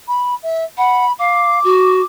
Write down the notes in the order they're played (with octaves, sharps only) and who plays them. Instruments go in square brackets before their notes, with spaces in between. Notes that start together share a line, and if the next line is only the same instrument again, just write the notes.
[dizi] B5
E5
[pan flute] F#5 [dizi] B5
[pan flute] F5 [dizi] D6
[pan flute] F#4